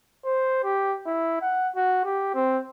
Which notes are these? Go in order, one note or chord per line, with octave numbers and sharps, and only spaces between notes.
C5
G4
E4
F#5
F#4
G4
C4